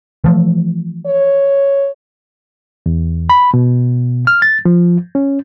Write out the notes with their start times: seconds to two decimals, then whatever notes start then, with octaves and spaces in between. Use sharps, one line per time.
0.24 E3 F3 A3
1.06 C#5
2.86 E2
3.29 B5
3.54 B2
4.27 F6
4.42 A6
4.65 F3
5.15 C#4